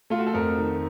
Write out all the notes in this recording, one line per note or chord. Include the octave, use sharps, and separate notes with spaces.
A3 F4
F#4
A4
F2 A#4
D#3